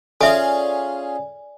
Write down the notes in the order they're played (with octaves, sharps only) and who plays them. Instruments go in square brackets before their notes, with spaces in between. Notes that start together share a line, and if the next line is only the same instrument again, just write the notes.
[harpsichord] C#4 F4 G#4 [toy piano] A4 E5 [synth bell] D5 G#5